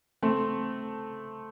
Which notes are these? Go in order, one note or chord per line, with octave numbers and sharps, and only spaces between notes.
A3 C4